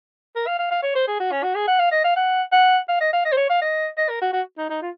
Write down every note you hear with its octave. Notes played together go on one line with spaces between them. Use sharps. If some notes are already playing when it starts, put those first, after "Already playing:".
A#4
F5
F5
F5
C#5
C5
G#4
F#4
C#4
F#4
G#4
F#5
F5
D#5
F5
F#5
F#5
F5
D#5
F5
D#5
C5
C#5
F5
D#5
D#5
A#4
F#4
F#4
D#4
D#4
F4